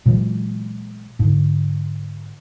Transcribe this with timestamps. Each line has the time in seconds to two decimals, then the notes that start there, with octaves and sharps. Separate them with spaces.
0.06 A#2 E3 F#3 G#3
1.19 G#2 D3